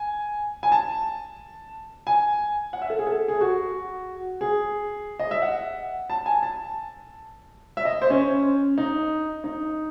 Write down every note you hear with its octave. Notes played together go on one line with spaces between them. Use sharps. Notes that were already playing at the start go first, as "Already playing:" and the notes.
Already playing: G#5
G#5
A5
G#5
F#5
E5
A4
G#4
A4
G#4
F#4
G#4
D#5
E5
F#5
A5
G#5
A5
E5
D#5
C5
C#4
D#4
D#4